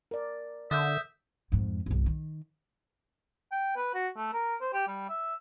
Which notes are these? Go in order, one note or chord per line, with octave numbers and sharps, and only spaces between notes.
A#4 D5
D3 E5 D#6 G6
F2 G#2
G1 C2
D#3
G5
B4
F#4
A3
A#4
C5
G4
G3
E5